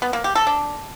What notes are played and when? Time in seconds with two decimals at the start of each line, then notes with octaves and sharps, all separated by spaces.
0.02 B3
0.13 A#3
0.24 G4
0.35 A4
0.47 D4